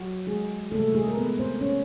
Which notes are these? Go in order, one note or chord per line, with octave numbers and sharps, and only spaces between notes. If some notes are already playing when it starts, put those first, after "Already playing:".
Already playing: F#3 F#4
G#3 G#4
C3 E3 G3 A3 A#3 A4
G#3 G#4
A#4
B3 B4
C4 C5
C#4 C#5